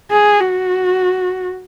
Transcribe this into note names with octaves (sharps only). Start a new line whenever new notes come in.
G#4
F#4